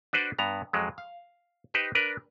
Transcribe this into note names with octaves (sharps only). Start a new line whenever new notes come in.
D4 F#4 B4 C5 D5
G2 B3 A#5
F2 F#3 G#3
F5
D#4 G4 B4 C5
D4 A#4 B4